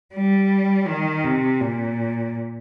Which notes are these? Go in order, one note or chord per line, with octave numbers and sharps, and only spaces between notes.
G3
D#3
C3
A#2